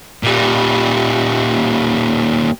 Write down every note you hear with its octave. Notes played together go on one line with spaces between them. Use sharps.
A#2 G3